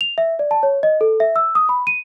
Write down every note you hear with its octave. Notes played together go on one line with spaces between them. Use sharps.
F7
E5
D5
A5
C#5
D#5
A4
E5
E6
D#6
B5
D#7